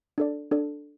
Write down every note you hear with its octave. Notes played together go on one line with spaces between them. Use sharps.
D4 A4 D5
D4 A4 D5